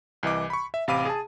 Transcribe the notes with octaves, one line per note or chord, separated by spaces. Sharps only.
C2 E3 D#5 D6
B5 C#6
E5
A1 C3 F5 B5 D6 D#7
G#4 A5